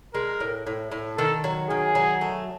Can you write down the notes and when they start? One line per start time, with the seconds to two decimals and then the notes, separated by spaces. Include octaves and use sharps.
0.15 G#3 A#4
0.40 A2
0.67 A2
0.92 A2
1.18 D#3 A4
1.44 F#3
1.70 D#3 G#4
1.95 F#3
2.21 A3